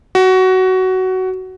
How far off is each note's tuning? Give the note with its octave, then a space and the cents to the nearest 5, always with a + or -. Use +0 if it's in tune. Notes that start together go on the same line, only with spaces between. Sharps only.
F#4 +15